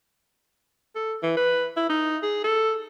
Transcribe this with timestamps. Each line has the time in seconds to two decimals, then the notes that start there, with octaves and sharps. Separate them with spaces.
0.96 A4
1.23 E3
1.37 B4
1.77 E4
1.90 D#4
2.23 G#4
2.44 A4